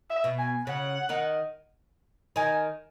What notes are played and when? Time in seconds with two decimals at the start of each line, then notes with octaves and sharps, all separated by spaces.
0.10 E5
0.24 B2 B3
0.39 G#5
0.67 C#3 C#4 F#5
1.09 D#3 D#4
2.36 D#3 D#4 G#5